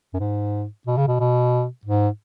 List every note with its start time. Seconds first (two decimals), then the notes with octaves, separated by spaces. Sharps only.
0.14 F#2
0.20 G#2
0.87 B2
0.97 C#3
1.07 B2
1.20 B2
1.85 G#2